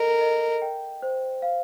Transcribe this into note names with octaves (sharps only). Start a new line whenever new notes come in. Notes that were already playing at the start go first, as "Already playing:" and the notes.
Already playing: A4 A#4 D#5
D#5
G5
C5
F5